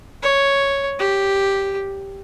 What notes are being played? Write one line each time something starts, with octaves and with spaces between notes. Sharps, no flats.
C#5
G4